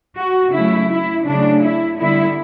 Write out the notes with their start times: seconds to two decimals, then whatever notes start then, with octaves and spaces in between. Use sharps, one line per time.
0.17 F#4
0.53 C#3 F#3 A3 E4
0.90 E4
1.26 C#3 F#3 A3 D4
1.63 E4
1.99 D3 G3 B3 E4